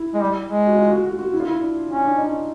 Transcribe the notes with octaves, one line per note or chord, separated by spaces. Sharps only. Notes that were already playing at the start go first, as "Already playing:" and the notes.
Already playing: E4
G#3
G3
G#3
F#4
F4
F#4
F#4
F#4
E4
F4
E4
D4
C#4 D4
D4
D#4